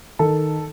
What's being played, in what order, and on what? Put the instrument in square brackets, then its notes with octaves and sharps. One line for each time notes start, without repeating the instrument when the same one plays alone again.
[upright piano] D#3 A4